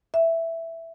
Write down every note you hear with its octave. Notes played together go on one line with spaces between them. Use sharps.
E5